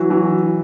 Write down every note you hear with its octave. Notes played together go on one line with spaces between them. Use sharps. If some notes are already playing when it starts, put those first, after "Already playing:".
Already playing: E3 F#3
E3 F#3